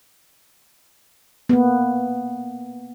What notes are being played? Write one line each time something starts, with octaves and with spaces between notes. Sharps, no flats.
A#3 B3